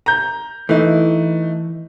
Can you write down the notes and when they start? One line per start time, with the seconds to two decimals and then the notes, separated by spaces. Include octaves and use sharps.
0.06 A#5 G6
0.69 E3 A3 D#4